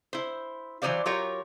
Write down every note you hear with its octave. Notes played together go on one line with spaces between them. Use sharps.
E4 C5
E3 F#3 G#3 C5 D5 F5
F#3 F4 G4 A#4 C#5